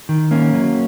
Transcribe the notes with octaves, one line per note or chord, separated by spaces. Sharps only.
D#3
A#3 C#4
F#3